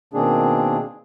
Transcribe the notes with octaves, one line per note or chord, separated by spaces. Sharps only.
B2 D#3 A#3 C4 D4 G#4